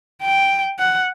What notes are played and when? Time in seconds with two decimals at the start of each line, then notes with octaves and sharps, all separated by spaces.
0.23 G5
0.79 F#5